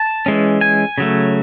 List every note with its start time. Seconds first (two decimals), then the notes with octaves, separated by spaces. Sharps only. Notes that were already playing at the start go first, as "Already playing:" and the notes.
Already playing: A5
0.26 E3 G#3 C#4
0.61 G#5
0.98 C#3 F#3 A3